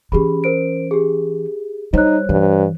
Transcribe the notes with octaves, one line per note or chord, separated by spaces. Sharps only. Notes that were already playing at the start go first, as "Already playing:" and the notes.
E3 C#4 G4 G#4 B5
A#4 C5 D7
G4 G#4
G3 D#4 C5 C#5 F#6
G2 E3